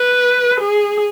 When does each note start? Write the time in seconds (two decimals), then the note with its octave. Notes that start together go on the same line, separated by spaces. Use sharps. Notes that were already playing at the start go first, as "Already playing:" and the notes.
Already playing: B4
0.60 G#4